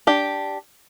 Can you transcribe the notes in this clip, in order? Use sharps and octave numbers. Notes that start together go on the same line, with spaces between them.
D4 G4